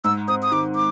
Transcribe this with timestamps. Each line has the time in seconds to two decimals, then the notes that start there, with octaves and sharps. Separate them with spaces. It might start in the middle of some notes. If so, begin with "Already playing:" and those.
0.04 G#2 E6
0.28 C4 D#6
0.43 D#6
0.52 D#3 D6
0.76 D6